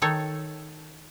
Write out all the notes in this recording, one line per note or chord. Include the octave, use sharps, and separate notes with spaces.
D#3 D#4 A4 C#5